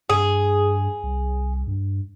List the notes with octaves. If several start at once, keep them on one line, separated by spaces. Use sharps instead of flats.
G2 G#4
C2
G2